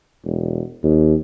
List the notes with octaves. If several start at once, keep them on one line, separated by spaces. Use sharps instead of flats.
E1
D#2